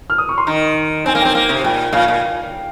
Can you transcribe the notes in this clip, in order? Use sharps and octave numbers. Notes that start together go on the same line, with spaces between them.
F6
D#6
C#6
C6
D#3 A#5
C4 G#5
A#3
G5
C4
A#3
C3
A#2 G5
A#2 F5
A#2